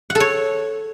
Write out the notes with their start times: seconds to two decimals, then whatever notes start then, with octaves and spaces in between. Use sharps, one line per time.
0.10 F#5
0.15 A4
0.20 C#5